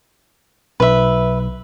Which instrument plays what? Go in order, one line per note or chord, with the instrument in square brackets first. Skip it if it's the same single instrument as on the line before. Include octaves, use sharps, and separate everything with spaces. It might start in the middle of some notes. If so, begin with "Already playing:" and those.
[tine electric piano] B1 [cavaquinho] B4 E5